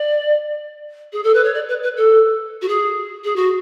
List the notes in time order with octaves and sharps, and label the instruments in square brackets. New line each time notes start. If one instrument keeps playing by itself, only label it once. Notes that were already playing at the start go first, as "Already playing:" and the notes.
Already playing: [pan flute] D5
G#4
A4
B4
C#5
D5
B4
B4
A4
F#4
G#4
G#4
F#4